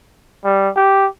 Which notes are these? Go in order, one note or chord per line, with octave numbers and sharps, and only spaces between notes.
G3
G4